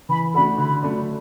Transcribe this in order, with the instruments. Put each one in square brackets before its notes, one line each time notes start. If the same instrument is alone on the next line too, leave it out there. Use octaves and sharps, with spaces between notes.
[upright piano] E3 [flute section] B5
[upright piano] A3 D4 F#4 A4 [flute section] B5
[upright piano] D3 [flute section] B5
[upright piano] F#3 A3 D4